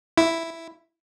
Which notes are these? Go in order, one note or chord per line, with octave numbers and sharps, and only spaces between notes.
E4